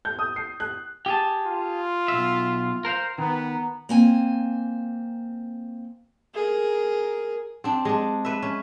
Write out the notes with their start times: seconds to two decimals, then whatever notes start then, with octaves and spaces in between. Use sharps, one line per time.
0.05 G6
0.19 D#6
0.36 C7
0.60 F#6
1.06 G4 G#4 A5
1.45 F4
2.08 B1 E5
2.85 A#4 C5 F5
3.18 D#3 B3 A#5
3.89 A#3 C4 G#5
6.35 G#4 A#4
7.64 C4 D4
7.85 G#3 D4
8.25 B4 E5
8.42 C#4